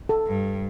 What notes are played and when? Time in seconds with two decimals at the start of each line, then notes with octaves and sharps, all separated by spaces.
0.09 A4
0.27 G2